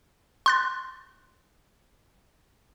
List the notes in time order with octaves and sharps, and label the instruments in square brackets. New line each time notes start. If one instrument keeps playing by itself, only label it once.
[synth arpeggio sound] C6 F#6 A6